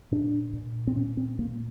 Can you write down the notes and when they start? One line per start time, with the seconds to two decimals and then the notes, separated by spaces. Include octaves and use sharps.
0.12 A#2 D4
0.53 A#2
0.87 C4
0.96 A#2 C#4
1.17 C4
1.39 A#2 A#3